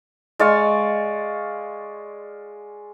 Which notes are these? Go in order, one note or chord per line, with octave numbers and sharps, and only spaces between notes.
G#3 D5 F5 C#6